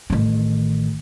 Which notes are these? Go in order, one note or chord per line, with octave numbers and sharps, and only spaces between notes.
A1 D#3